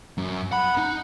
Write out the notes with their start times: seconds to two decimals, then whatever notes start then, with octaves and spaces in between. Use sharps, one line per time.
0.18 F#2
0.52 F#5 B5
0.77 D#4